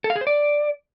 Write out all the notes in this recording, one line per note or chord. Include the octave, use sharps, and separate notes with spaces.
A4
F5
G#4
C5
D5